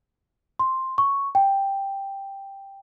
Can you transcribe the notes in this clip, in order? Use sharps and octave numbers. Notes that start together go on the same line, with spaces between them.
C6
C#6
G5